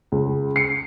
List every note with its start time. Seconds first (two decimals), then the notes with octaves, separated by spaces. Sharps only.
0.12 C#2
0.56 C7 C#7